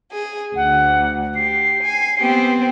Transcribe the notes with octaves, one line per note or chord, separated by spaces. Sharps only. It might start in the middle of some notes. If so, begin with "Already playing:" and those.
G#4
D2 F#5
G4 C7
G#5
B3 C4 G4